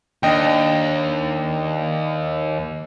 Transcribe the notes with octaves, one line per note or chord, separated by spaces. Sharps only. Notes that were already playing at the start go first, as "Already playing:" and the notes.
D#2 D4 D#5 G5